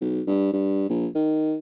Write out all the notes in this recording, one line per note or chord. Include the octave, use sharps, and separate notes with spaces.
B1
G2
G2
A#1
D#3